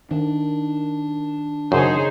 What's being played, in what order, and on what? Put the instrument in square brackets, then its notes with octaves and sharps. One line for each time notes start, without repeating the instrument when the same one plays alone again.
[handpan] D#3 [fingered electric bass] D4
[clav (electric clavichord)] F#2 [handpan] C#3 C#5 [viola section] D#4 G#4 C5